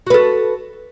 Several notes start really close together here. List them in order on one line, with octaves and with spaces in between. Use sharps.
F#4 B4 A4